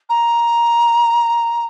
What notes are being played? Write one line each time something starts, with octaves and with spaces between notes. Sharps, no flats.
A#5